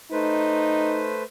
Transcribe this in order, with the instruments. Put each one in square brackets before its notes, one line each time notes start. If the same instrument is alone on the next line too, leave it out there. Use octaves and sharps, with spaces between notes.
[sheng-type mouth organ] A3 B4 C5 [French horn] D#4